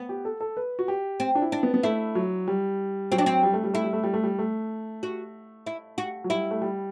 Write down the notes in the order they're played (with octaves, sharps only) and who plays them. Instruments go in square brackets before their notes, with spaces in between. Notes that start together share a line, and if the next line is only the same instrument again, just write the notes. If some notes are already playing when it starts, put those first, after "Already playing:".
Already playing: [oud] B3
[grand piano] G4
A4
A4
B4
F#4
G4
[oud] C4
[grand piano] D4
E4
[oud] D4
[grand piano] B3
B3
[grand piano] A3 [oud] E4
[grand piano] F#3
G3
[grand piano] F#3 [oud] C4
[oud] D4
C4
[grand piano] G3
A3
G3
[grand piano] A3 [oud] E4
[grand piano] G3
A3
G3
A3
G3
A3
[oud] F#4
E4
F#4
[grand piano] F#3
[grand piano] G3 [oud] E4
[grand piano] A3
G3